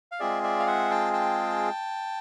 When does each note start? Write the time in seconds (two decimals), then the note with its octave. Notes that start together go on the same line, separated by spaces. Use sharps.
0.12 F5
0.20 G#3 C4 F4 G#4 D5 E5
0.43 D5 E5
0.59 F5
0.67 E5 F#5
0.91 G5 A5
1.13 G5 A5